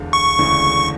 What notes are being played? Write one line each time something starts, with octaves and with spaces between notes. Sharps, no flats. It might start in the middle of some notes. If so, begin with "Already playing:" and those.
Already playing: E1 E2 D3
C#6
E1 D2 C#3 E3